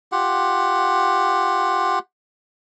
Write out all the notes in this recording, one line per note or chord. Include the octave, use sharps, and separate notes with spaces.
F4 G4 F#5